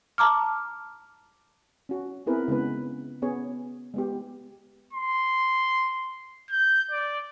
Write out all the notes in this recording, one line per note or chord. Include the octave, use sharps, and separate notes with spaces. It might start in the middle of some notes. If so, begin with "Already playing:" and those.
A5 A#5 D6 F6
C#4 F#4
B3 C4 E4 G#4 A#4 B4
C#3 G#3 B3 B4
B3 C#4 G#4 C#5
G#3 B3 G4
C6
G6
D5